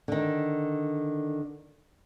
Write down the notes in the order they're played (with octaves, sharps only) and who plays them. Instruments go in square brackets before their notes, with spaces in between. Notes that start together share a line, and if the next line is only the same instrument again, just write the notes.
[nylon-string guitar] D3 D#3